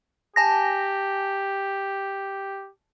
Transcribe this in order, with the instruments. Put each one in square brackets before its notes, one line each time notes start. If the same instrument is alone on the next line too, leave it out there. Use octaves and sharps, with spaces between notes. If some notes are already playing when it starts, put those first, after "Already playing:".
[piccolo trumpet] G4 [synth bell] G#5 A5 A#6